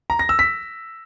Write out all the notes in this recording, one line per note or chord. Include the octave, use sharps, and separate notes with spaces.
A#5
A#6
E6
B6